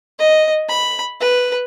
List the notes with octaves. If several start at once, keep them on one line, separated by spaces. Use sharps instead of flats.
D#5
B5
B4